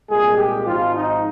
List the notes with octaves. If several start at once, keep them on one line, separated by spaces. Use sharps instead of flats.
C2 A#2 G#3 G#4
G4
G#1 G#2 F3 F4
D#4